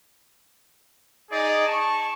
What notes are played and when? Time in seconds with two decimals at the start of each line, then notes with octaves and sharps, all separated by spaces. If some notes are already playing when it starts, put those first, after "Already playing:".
1.31 D#4 G#4 D5
1.67 A5 C#6